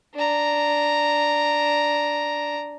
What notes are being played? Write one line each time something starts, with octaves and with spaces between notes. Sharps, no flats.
D4 A#5